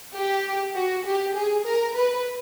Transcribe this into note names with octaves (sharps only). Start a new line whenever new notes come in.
G4
F#4
G4
G#4
A#4
B4